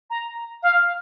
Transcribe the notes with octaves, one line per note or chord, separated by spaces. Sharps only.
A#5
F5